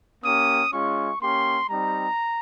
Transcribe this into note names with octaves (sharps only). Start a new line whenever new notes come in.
A#3 C#4 G4 D#6
G#3 C#4 F4 C#6
A#3 C#4 G4 C6
G3 C4 D#4 A#5